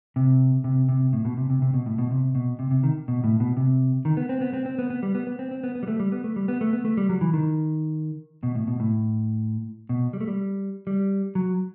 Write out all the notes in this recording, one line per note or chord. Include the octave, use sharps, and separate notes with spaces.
C3
C3
C3
A2
B2
C3
C3
C3
B2
A2
B2
C3
B2
C3
C3
D#3
B2
A2
B2
C3
D#3
B3
C4
B3
C4
C4
B3
B3
G3
B3
B3
C4
C4
B3
B3
G3
A3
G3
B3
A3
G3
B3
A3
B3
A3
G3
F#3
E3
D#3
B2
A2
B2
A2
B2
G3
A3
G3
G3
F#3